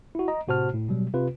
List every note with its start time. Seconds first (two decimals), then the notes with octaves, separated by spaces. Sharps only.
0.15 E4 F#4
0.28 D#5 A#5
0.48 A2 C3 F#4 C5 A5 F6
0.74 A2
0.89 B2 F#3 G3
1.14 C3 F4 B4